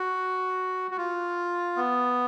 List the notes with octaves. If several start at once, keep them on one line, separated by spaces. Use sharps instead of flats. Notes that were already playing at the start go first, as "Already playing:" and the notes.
Already playing: F#4
F#4
F4
B3